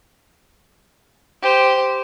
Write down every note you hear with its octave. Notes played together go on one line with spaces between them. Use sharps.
G4 C5